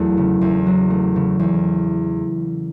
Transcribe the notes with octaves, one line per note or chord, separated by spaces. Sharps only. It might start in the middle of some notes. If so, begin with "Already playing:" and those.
Already playing: E2 F#3 A3
C#3
E2
F#3
A3
C#3
E2